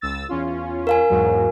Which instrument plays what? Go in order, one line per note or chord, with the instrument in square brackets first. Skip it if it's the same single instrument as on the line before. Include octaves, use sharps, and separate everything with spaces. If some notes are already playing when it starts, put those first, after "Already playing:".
[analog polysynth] C#2 E6 A6
E2 C#4 F4
[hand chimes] A#4 F5 G#5
[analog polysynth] E2 G#2 F#3